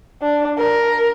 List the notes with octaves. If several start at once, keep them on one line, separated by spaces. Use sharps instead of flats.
D4
A#4